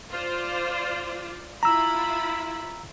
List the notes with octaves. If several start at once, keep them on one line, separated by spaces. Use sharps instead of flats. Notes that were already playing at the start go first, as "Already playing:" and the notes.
F4 C5 D5
E4 F4 A#5 B5 E6